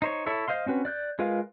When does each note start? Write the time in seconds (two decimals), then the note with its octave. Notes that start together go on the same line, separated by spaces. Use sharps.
0.02 D#4 C5 C#5
0.26 E4 A4 C#5 E5
0.48 C5 D#5 F5 C6
0.66 C4 C#4 F#4 B4
0.85 D5 F#6 G6
1.19 G#3 F4 A#4 B4 F5